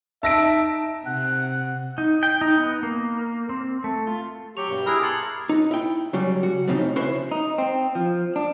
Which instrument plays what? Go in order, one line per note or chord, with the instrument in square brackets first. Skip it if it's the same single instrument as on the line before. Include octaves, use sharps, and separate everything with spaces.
[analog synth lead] D#4 [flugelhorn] E5 [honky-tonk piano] A5 A#6 D7
[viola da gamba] C3 [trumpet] F#5 [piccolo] F#6
[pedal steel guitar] D#4
G5
D#4
B3
A#3
C4
A3
F4
[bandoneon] F#3 C#6 [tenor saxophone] G4 [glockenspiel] F7
[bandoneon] G2 B2
[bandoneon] E4 G#4 A#4 [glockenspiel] A#5 E6 F#6
[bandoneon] A5 C6 [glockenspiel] G#6 C#7 F#7
[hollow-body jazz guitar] D#4
E4 G5
C#3 F#3 G3
F#4
F2 A2 C#3 A#3 C4 D#4
C#4 E4 F#4 B4 C5 E5
[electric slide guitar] D#4
C4
F3
D4